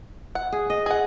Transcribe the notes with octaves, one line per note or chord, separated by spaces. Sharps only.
F#5
G#4
D#5
G#4 F#5